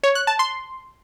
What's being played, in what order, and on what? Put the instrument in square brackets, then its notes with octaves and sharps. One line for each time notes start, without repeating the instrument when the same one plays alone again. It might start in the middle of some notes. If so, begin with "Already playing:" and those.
[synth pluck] C#5
F#6
A5
C6